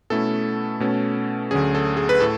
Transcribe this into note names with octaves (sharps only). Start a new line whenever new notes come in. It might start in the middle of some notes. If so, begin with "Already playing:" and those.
B2 A3 C#4 E4 A4
B2 A3 C#4
D2 D3 F#3 C#4 G#4
A4
G#4
B4
A2 A4